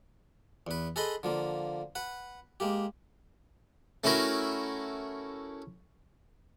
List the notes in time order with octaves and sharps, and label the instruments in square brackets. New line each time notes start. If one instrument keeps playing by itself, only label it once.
[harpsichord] E2 B4
G#4 A4 B4 D#5 B5 C6
D3 F3 A#3
B4 F#5
G#3 A#3 G4
A3 C#4 E4 F#4 A#4